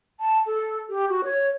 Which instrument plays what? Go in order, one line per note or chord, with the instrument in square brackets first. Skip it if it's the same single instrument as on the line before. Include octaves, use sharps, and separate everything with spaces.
[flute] A5
A4
G4
F#4
C#5